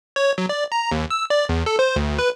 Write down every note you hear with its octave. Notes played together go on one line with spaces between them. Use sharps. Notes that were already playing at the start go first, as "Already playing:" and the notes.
C#5
F#3
D5
A#5
D#2
E6
D5
E2
A4
C5
D2
B4